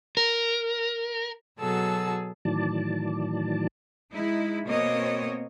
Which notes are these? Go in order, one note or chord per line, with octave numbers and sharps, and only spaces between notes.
A#4
B2 F#3 G#4 A4 A5 E6
A2 D#3 E3 F#3 D5 A5
G#3 D#4 E4
B2 A#3 C4 C#5 D#5